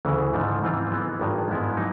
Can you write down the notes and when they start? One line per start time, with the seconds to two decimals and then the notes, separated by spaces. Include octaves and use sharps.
0.05 D2 C#3 E3
0.33 G#2 F3 A3
0.62 G#2 E3 G3 C4 F4
0.91 E3 G#3 B3
1.19 G#1 G2 D#3 G#3
1.48 G#2 F3 G#3 B3 E4
1.77 F#3 A#3 D#4